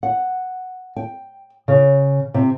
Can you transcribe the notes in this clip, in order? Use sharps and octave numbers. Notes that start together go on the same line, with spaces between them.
F#5
G5
C#3
C3